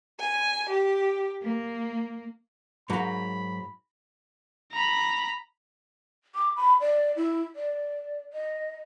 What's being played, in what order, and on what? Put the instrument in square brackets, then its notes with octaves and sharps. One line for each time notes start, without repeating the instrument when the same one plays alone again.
[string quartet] G#5
G4
A#3
[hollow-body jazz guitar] G#2 F#3 A#3 [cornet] B5
[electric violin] A#5 B5
[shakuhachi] D6
B5
D5
E4
D5
D#5